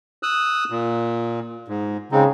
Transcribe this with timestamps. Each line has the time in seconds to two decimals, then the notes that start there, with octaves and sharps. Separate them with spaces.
0.23 D#6 E6 F#6
0.70 A#2
1.68 G#2
2.12 C#3 G#3 C4 D#4